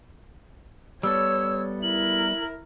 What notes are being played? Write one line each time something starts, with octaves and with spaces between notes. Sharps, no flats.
G3 B3 A4 C#5 E6
E4 A#4 F#7